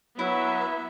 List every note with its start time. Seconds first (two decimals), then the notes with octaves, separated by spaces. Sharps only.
0.19 F#3 B3 E4 E5